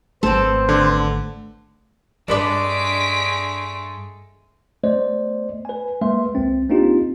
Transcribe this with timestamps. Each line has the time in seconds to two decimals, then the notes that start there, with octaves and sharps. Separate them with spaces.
0.23 G#1 A3 B3 C4 A4 C5
0.69 D3
2.28 G2 G#3 A3 D4 B4 D5 B6 D7
4.84 A3 B3 C5 D5 D#5
5.65 B4 G#5
6.01 G#3 A#3 B4 E5 C6
6.35 C2 C4
6.69 A#3 C4 D4 D#4 F4 G4